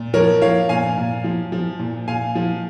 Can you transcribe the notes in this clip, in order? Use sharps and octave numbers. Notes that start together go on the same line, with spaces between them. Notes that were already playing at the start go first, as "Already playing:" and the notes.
Already playing: A#2
F3 A#4 C#5
F3 C#5 F5
A#2 F5 G#5
A#2
F3
F3
A#2
A#2 F5 G#5
F3